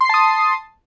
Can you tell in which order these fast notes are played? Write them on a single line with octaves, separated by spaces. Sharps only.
C6 C7 A5 D#6